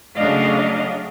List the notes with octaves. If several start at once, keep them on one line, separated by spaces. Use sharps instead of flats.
C#3 F#3 A3 D4 D#5 F5